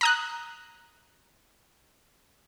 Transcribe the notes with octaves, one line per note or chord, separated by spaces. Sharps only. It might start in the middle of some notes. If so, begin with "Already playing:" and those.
A#5 D#6 F#6